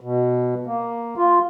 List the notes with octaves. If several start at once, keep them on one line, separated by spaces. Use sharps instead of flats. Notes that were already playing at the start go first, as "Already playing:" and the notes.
B2
A#3
F4